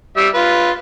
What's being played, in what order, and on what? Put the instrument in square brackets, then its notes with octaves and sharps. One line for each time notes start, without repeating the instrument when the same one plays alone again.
[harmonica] G3 E5
F4 B4